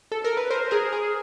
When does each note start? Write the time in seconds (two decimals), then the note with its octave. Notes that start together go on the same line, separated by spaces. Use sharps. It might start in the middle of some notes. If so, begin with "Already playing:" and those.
0.12 A4
0.24 A#4
0.37 B4
0.50 A#4 C5
0.71 G#4 A#4
0.93 G#4